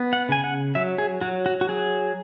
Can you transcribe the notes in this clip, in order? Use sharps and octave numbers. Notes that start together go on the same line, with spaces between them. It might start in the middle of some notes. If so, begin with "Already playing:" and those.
Already playing: B3
F#5
C#3 G#5
F#5
F#3 E5
G#4
F#3 F#4
F#4
F#4
F#3 G#4